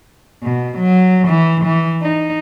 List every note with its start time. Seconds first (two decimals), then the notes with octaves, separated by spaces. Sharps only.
0.43 B2
0.78 F#3
1.27 E3
1.65 E3
2.02 D#4